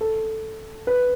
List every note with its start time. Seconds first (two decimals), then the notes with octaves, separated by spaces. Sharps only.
0.01 A4
0.87 B4